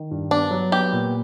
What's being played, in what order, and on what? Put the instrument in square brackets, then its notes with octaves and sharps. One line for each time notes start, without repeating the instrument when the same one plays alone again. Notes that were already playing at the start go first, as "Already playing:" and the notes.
Already playing: [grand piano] D#3
G2
[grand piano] B3 [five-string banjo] D4
[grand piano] F#3
[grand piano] B3 [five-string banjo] G4
[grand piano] A#2